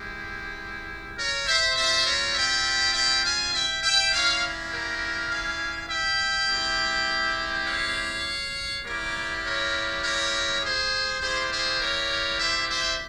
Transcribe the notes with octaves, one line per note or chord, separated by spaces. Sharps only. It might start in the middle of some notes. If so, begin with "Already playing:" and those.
Already playing: G#3 E4 G4
A#4 C#5
C5 E5
G3 C4 F4 C5 E5
A#4 C#5
E5 G5
E5 G5
F5 G#5
E5 G5
E5 G5
A#3 C#4 E4 C#5 F5
G4 A#4
F5 G#5
E5 G5
G#3 C4 E4 G4
C#5 F5
G3 A#3 E4 G4 A#4 C#5
A#4 C#5
A#4 C#5
G#4 C5
G3 A#3 E4 G4 G#4 C5
G#4 C5
A#4 C#5
C5 E5
C5 E5